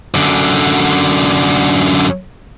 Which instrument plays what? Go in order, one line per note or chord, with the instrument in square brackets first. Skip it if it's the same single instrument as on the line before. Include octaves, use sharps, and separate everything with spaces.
[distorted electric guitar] F#2 D3